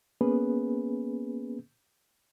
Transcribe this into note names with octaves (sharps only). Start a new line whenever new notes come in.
A#3 B3 C#4 G#4 B4